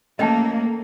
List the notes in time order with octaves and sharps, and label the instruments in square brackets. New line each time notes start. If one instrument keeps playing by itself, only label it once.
[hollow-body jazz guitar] A3 C#4 [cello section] A#3 [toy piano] D#5 G5 A5